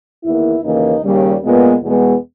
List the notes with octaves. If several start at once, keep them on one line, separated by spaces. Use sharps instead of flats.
E2 D#3 A#3 E4
D#2 C#3 E3 A#3 D#4
D#2 C#3 G3
A#2 G#3 B3
E2 B2 G#3 B3